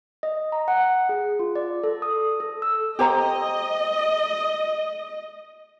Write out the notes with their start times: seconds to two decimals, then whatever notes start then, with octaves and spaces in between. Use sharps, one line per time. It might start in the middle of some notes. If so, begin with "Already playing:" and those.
0.23 D#5
0.52 A#5
0.68 F#5
1.09 G#4
1.39 F4
1.56 D5
1.84 A4
2.02 D#6
2.40 A4
2.62 E6
2.99 G4 C5 D#5 A#5